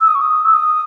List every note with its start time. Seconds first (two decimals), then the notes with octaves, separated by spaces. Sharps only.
0.01 E6
0.07 D#6
0.15 C#6
0.21 D#6
0.45 E6
0.53 D#6